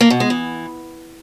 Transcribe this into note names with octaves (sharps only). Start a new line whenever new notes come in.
A#3
B2
G#3
E3